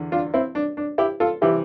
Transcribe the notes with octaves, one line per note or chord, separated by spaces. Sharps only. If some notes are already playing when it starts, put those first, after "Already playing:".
Already playing: E2 D3
D4 F4
C4 E4
D4
D4
E4 G4
F4 A4
C3 E3 G3 E4 G4